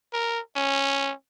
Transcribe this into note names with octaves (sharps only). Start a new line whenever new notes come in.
A#4
C#4